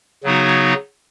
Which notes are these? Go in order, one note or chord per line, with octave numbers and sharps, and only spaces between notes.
C#3 F#3 B3 D#4 F#4